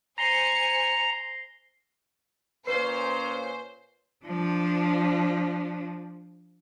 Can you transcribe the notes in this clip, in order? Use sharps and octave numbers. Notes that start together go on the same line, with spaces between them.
C5 G#5 A#5 A#6 C7 C#7 G7
A#2 C#4 B4 C5 C7
F3 D4